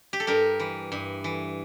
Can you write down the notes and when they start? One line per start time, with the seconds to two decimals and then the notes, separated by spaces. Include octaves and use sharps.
0.13 G4
0.20 A4
0.27 G2 G4 A#4
0.60 E3
0.92 G2
1.24 E3